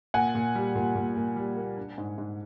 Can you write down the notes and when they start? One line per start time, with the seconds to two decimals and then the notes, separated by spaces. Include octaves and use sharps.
0.14 A#2 F#5 G#5
0.35 A#2
0.55 G3
0.75 A#2
0.95 A#2
1.17 A#2
1.36 G3
1.56 A#3
1.77 D4
1.98 G#2
2.18 G#2